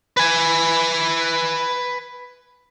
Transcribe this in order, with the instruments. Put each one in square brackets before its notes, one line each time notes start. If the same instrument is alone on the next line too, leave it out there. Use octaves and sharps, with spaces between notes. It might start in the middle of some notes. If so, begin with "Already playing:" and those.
[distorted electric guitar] B4 G#5